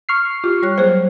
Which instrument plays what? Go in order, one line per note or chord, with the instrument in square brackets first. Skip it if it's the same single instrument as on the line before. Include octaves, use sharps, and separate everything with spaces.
[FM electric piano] C#6 F6 C7
[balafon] F4 [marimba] G4
[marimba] G3 C#5 F#6
[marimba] F#3 A#3 G#4 [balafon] C5